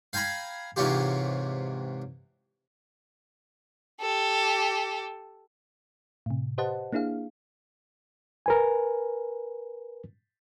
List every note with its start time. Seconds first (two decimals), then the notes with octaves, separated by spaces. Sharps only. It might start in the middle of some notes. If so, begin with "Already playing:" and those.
0.13 F5 G5 G#5 A#5 B5
0.76 G#2 C3 E3 C#4 F4 G4
4.01 G4 A4
6.26 A2 C3
6.58 G4 B4 C5 D#5 F#5 A5
6.93 A#3 D4 E4 G#4 F5
8.46 A#4 B4 G#5